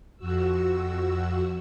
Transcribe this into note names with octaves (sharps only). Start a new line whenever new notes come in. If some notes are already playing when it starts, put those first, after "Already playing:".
F2 F#4 E6